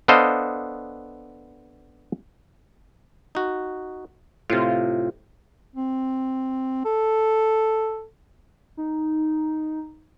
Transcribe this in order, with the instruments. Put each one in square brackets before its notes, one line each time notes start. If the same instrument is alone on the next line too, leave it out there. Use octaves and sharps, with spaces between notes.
[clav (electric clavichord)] B3 D4 A4 C5 D#5 F5
D#4 F#4
[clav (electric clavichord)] A2 C3 [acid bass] F4
[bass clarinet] C4
A4
[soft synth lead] D#4